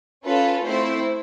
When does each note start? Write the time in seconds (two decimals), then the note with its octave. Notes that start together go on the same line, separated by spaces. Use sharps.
0.24 C#4 F4 A4 B4
0.65 A3 C4 E4 C5